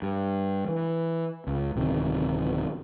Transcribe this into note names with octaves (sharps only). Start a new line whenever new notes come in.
G2
E3
C#2
D1 C3 D#3